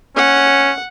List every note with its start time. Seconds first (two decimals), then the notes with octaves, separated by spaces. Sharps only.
0.17 C#4 F#5